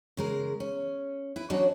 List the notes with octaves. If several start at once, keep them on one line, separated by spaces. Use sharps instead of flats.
C#3 G#3 A#4
C#4
E4 B4
F#3 C#4 D4 F#4 C#5 D#5